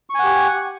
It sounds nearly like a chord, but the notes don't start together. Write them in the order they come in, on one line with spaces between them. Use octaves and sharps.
C#6 G#5 F#5 G4